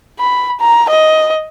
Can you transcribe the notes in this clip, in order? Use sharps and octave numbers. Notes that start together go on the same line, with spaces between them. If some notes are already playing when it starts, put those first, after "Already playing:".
B5
A#5
D#5